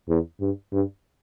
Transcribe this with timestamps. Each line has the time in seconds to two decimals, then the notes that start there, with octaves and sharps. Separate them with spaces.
0.09 E2
0.41 G2
0.73 G2